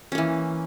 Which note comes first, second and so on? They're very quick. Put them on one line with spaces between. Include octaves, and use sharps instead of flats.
C#4 A#3 E3